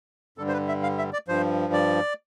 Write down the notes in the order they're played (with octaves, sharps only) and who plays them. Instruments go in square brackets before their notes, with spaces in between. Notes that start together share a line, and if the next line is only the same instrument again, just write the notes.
[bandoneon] G2 D3 G3 A4
C5
B4
E5
F5
E5
D5
G2 F3 C5
D5